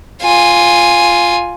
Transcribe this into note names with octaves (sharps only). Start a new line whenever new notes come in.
F4 G#5